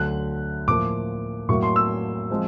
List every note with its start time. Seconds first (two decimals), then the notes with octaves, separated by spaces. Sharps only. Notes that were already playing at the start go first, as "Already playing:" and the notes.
Already playing: D2 D3 F#3 F#6
0.68 A2 F3 A#3 D6
1.49 A2 F#3 A#3 C#6
1.62 C6
1.76 E6
2.30 F3 G#3 C4